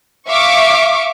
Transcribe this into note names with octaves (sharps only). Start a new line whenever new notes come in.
E5 F5 C#6 D6